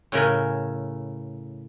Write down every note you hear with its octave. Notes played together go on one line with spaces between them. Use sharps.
A2 C#3 A#4 G#5